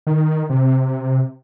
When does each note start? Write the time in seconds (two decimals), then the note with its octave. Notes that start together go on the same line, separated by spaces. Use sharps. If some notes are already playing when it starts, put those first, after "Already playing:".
0.07 D#3
0.50 C3